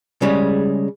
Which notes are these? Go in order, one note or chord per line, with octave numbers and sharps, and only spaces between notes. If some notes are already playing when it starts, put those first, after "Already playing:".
C#3 G3 G#3